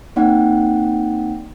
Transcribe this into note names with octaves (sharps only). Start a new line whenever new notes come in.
A#3 C4 D#4 D5 F#5 G5